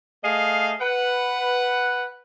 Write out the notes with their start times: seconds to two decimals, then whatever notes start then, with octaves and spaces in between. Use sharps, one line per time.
0.24 A3 G#4 D#5 F5
0.81 B4 F#5